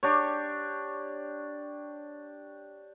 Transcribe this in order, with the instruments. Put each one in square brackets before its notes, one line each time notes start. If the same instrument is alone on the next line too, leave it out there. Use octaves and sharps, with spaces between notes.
[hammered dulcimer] D4 G4 C#5